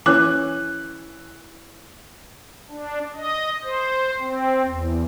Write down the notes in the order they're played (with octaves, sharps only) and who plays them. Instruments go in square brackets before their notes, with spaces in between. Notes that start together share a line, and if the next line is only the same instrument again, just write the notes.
[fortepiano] E3 C#4 [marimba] D6 [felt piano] F#6
[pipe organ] D4
D#5
C5
C4
E2